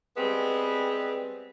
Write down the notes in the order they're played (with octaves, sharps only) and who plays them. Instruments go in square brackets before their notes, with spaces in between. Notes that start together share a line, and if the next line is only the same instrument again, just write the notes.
[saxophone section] G3 G#3 B3 C4 G#4